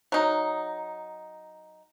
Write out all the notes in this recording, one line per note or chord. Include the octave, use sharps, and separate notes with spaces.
F#3 D#4